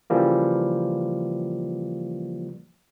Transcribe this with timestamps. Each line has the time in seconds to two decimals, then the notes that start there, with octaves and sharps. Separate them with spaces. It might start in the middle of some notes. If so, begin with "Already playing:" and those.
0.10 C#3 E3 F3 G3 A#3